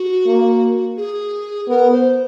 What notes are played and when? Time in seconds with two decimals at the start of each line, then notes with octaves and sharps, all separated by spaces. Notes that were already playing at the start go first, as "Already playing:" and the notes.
Already playing: F#4
0.27 A#3
0.97 G#4
1.68 B3 A#4
1.92 C5